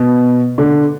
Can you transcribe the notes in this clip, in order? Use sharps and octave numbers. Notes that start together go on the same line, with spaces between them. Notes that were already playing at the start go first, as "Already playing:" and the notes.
Already playing: B2
D3